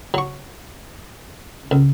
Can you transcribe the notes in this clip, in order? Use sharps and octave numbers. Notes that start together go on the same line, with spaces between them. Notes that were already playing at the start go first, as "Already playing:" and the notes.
F#3 C#6
C#2